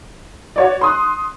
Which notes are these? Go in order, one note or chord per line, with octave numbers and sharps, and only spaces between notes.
F#4 C#5 D5
C6 D#6 F#6